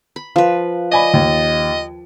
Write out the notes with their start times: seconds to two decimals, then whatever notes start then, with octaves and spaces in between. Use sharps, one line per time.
0.16 B5
0.36 F3 B4
0.92 D5 D#5 G#5 B5
1.14 D#2